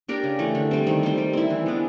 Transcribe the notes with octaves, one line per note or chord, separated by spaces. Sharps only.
D4 G4 A#4
C#3
E3 A3
D3
G3 C4
D#3
G3 C4
G3
C4 E4
E3
G#3 B3 D4